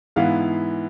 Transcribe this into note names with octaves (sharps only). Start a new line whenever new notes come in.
G#2 E3 B3 E4 F5